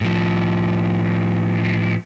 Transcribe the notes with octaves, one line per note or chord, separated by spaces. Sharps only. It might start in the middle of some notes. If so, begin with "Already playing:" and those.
A2 F3